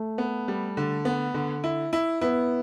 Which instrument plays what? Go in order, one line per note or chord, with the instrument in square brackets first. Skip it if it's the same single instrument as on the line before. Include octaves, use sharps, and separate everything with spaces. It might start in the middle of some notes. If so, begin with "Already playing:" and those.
Already playing: [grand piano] A3
[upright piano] B3
G3
D3
B3
D3
E4
E4
[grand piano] B3 [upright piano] E4